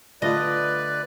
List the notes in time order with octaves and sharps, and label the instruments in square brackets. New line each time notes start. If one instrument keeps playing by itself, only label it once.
[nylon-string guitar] D3 A3 F4 [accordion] B4 D5 [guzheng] D#5